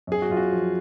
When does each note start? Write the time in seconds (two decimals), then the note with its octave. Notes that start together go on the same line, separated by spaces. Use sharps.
0.07 F#2 G#4
0.22 F#4
0.30 F#2 F4
0.37 F#4
0.52 F3